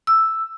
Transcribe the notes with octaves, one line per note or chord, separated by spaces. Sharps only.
E6